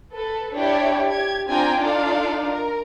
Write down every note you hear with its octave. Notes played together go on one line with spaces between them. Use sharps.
A4 B4
D4 E4 G4 C#5 D5 G5
G4 G#6
C4 D4 F4 G5 G#5 A#5
D4 D#4 F4 A4 D5 F5
A#4